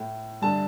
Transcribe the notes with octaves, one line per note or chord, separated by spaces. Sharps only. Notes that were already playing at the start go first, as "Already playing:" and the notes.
Already playing: A2
G2 D3 A5